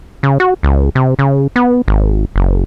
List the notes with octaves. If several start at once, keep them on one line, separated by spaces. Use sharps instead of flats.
C#3
F#4
C#2
C3
C#3
B3
G#1
F#1